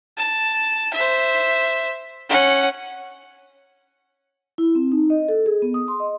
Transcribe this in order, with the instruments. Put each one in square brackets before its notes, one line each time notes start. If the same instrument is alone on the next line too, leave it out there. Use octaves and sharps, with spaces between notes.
[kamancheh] A5
C5 E5
C#4 F#5
[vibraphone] E4
C4
D#4
D#5
A4
G#4
B3
D#6
C6
D#5